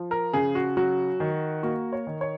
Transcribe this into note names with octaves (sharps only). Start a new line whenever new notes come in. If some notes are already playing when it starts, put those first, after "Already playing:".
Already playing: F3
A#4
C#3 G#4
F#4
F#3 F#4
D#3
A#3 F#4
C#5
D#3
C#5